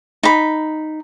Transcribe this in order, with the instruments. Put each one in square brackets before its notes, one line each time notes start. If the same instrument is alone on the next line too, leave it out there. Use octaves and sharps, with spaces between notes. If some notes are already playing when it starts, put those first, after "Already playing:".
[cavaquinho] D#4 B5